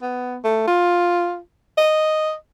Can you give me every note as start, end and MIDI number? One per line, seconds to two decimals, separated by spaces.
0.02 0.37 59
0.44 0.65 57
0.67 1.38 65
1.78 2.34 75